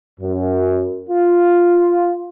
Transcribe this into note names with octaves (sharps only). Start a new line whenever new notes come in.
F#2
F4